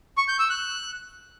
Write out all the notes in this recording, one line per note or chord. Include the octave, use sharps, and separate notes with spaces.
C#6
G6
E6
F#6